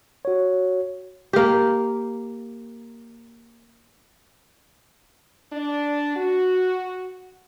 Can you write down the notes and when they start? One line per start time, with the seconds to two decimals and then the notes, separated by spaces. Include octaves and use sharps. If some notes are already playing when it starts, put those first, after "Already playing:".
0.25 F#4 C#5
1.33 A#3 G4
5.51 D4
6.15 F#4